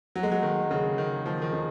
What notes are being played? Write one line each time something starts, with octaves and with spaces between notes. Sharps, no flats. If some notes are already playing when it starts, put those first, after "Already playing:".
F#3
G#3
F#3
D#3
C#3
D#3
F3
D#3
C#3